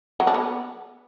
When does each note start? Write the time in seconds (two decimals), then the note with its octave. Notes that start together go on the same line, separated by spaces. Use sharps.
0.20 F#3
0.27 D4
0.34 B3